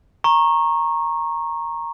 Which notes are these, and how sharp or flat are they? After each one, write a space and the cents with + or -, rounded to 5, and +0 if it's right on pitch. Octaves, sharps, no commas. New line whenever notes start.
A#5 +0 C#6 -20